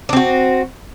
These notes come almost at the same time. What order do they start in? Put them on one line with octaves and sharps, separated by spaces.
D4 C4 F#4